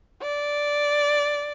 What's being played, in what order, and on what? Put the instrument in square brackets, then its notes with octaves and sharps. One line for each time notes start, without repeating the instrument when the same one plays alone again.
[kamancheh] D5